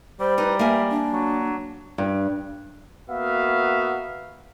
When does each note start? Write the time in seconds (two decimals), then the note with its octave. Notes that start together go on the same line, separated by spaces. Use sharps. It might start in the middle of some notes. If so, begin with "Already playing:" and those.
0.20 G3 C5
0.38 D#4 B4
0.59 A#3 E5 G#5
0.90 D4
1.13 F#3
1.98 G2
3.10 A#3 B3 F#4 E5 F5